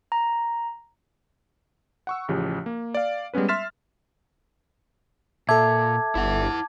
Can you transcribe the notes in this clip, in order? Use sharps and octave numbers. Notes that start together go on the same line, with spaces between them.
A#5
F#5 C#6 E6
A1 C#3 F3 G4
A#3
D5 F5
G3 G#3 B3 C#4 B4
E5 C6 F6 A6 B6 E7
A#2 A4 E5 A5 D6 G#6
G1 E4 F#5